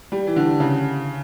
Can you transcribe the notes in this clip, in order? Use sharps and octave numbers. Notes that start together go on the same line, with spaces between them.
G3
E3
D3
C#3